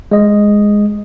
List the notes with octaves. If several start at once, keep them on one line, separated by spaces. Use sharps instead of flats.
G#3 D#5